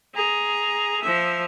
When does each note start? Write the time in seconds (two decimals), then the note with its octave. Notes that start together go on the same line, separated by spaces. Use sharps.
0.14 G#4 A#5
1.03 F3 E5